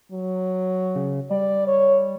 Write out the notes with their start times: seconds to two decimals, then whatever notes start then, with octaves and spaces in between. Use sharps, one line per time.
0.12 F#3
0.95 C#3
1.31 G3 D5
1.67 C#5